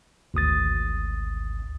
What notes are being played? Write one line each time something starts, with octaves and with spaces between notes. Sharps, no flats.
G#1 D2 D#6 A6